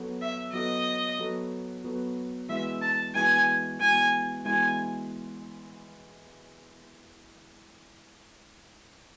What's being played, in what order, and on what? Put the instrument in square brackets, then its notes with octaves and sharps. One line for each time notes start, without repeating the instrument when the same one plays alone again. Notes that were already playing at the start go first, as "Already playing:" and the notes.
Already playing: [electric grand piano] F#3 B3 F#4 A4
[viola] E5
[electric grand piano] F#3 B3 F#4 A4 [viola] D#5
[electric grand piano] F#3 B3 F#4 A4
F#3 B3 F#4 A4
[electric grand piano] E3 G#3 B3 F#4 [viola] E5
[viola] A5
[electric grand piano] E3 G#3 B3 F#4 [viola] G#5
[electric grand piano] E3 G#3 B3 F#4 [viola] G#5
[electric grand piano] E3 G#3 B3 F#4 [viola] G#5